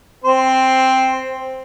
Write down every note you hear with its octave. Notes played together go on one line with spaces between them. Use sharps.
C4 C5